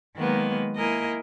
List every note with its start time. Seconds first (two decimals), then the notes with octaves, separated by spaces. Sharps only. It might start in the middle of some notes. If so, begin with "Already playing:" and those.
0.16 D#3 F#3 G#3 A#3 B3 B4
0.78 A#3 E4 A#4 D#5 G#5